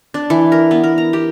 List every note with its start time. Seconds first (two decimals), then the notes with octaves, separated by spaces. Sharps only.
0.14 D4
0.30 E3
0.52 A#4
0.71 B3
0.84 A#4
0.98 A#5
1.13 G4